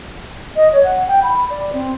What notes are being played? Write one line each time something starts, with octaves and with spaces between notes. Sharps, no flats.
D#5
C#5
F#5
G5
B5
D5
C4